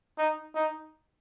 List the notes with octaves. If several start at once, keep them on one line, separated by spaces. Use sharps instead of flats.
D#4
D#4